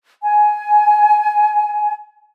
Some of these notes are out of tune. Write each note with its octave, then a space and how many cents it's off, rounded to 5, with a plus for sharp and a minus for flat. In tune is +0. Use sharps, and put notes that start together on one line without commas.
G#5 +10